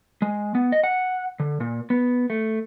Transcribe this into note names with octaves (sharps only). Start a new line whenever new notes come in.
G#3
B3
D#5
F#5
D3
A#2
B3
A3